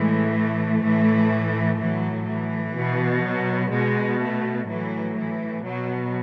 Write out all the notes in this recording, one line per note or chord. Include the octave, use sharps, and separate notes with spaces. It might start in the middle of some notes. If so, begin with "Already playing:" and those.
Already playing: A2 E3 G#3
A3
A2 E3
A2 E3 F#3
E3
B2
F#3
B2 G#3
A3
A2 E3 F#3
E3
B2 F#3